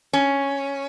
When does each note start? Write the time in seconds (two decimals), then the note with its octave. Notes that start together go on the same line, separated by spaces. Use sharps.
0.13 C#4